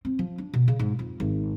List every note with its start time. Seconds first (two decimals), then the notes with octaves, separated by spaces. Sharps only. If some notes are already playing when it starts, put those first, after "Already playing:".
0.05 C4
0.19 F3
0.38 D4
0.54 B2
0.68 C#3
0.79 G#2
0.99 F2
1.20 G#1